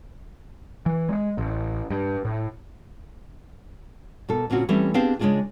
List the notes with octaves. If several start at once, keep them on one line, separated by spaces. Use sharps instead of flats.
E3
G#3
A1
G2
A2
B2 A#3 A4
D2 A#2 C4 C#4 F#4
E3 G3 A3 C4 C#4
B3 C4 D4 G4 G#4 F5
C#3 G#3 B3 D4 F4 G#4